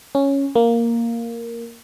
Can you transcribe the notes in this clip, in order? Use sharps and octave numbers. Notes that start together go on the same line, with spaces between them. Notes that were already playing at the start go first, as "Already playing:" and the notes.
C#4
A#3